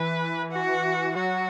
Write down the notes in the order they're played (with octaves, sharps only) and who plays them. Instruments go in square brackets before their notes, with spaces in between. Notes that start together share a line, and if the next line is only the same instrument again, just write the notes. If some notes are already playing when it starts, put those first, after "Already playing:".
Already playing: [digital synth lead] E3 [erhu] B4
[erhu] F#4
[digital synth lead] F#3 [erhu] F#4